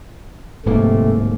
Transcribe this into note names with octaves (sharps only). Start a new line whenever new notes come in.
D1 G#2 C3 A3 A#3